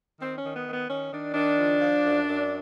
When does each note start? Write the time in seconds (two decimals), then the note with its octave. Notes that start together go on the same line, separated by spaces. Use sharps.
0.19 D#3 C4
0.37 C#4
0.42 D#3
0.54 B3
0.66 D#3 B3
0.88 D#3 C#4
1.11 D#3 D4
1.34 D#3 D4
1.57 F3
1.81 F3
2.03 F#2
2.26 F#2